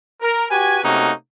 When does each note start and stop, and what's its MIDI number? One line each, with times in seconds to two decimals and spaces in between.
0.22 0.45 70
0.50 0.83 66
0.50 0.83 67
0.50 0.83 71
0.50 0.83 80
0.83 1.11 48
0.83 1.11 57
0.83 1.11 58
0.83 1.11 61
0.83 1.11 63
0.83 1.11 66